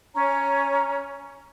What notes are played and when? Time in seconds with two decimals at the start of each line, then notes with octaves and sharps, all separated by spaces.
0.14 C#4 C#5 A#5